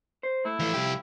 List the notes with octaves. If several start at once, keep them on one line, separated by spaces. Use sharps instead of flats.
C5
A3 E4
E3 F3 A3
C2 G4